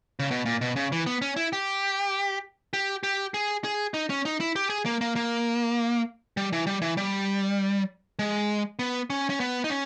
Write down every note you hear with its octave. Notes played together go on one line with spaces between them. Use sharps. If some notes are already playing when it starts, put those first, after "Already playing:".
C#3
B2
A#2
B2
C#3
E3
B3
C#4
E4
G4
G4
G4
G#4
G#4
D#4
C#4
D#4
E4
G4
G#4
A#3
A#3
A#3
G3
E3
G3
E3
G3
G#3
B3
C#4
C#4
B3
D#4
C#4